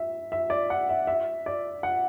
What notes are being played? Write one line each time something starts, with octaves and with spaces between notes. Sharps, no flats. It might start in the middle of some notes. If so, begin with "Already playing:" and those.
Already playing: E5
E5
D5
F#5
E5
E5
D5
F#5